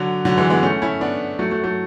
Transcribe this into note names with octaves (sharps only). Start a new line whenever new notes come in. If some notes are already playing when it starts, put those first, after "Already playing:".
Already playing: D3 F#3
D3 F#3
E3 G#3
G#3 B3
A3 C#4
C#4 E4
B3 D4
F#3 A3
F#3 A3
F#3 A3